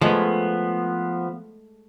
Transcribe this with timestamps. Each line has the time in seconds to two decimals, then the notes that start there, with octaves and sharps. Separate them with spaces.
0.01 F3 G#3 A3 B3